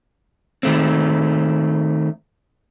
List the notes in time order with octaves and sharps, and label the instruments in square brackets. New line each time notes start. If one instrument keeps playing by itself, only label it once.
[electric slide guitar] D#3 A3 C4